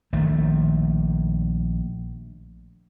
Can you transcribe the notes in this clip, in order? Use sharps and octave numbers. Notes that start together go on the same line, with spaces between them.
A#1 D#3 A3